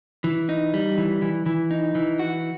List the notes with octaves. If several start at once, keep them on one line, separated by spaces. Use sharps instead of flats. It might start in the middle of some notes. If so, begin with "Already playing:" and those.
E3
D#4
G3
E3
E3
E3
D#4
E3
F#4